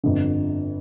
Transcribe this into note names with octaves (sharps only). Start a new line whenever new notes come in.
G1 F2 D3